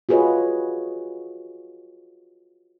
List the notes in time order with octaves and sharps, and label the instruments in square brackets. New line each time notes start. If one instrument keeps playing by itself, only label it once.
[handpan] F4 F#4 G#4 B4 C#5 D#5